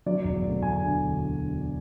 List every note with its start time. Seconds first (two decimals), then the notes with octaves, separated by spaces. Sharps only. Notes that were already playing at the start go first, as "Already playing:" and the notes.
0.06 F#3 D5
0.24 E1
0.44 D2
0.62 E1 G#5
0.81 D3